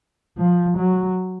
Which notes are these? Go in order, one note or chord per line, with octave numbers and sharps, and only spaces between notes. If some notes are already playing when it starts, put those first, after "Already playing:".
F3
F#3